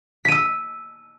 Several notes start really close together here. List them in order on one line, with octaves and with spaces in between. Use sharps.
B6 D#7 E6